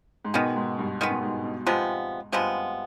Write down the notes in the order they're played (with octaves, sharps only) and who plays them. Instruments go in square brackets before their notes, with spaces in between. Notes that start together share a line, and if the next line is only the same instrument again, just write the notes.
[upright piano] G#2
[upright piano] B2 [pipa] D#3 G#3 B3
[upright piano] G#2
G2
[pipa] D#3 G#3 B3
[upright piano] B2
G#2
B2
[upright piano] G#2 [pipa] C3 F3 G#3 B3
[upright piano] G2 [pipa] C3 F3 G#3 B3